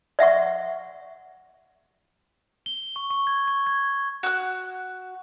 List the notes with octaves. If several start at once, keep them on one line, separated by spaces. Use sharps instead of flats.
D5 E5 F#5 C#6
G7
C#6
C#6
G#6
C#6
G#6
F#4 F#6